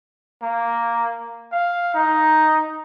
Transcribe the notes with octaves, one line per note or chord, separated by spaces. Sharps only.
A#3
F5
D#4